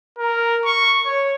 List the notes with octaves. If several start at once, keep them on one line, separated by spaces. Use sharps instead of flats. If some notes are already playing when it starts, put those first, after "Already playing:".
A#4
C#6
C#5